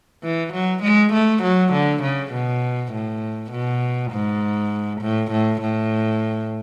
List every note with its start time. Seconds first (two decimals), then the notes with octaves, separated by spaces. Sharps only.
0.24 E3
0.54 F#3
0.83 G#3
1.13 A3
1.43 F#3
1.73 D3
2.03 C#3
2.33 B2
2.93 A2
3.52 B2
4.12 G#2
5.02 A2
5.32 A2
5.62 A2